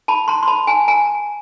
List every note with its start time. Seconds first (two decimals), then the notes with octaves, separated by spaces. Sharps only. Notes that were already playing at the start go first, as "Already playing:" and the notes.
0.08 A5 B5
0.28 A#5 C6
0.43 C6
0.48 A5 B5
0.67 G#5 A#5
0.88 G#5 A#5